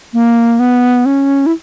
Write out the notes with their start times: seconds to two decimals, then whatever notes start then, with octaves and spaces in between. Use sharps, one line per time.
0.13 A#3
0.59 B3
1.06 C#4
1.46 E4